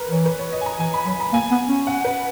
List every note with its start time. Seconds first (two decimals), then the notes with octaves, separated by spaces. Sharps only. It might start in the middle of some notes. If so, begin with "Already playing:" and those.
Already playing: A#4 B4
0.08 E3 C#5
0.26 B4
0.39 C#5
0.53 D#5
0.61 G#5
0.66 A#5
0.80 E3 G#5
0.94 B5
1.06 F#3 B5
1.20 A#5
1.33 A#3 G#5
1.51 B3
1.69 C#4
1.87 F#5
2.05 B4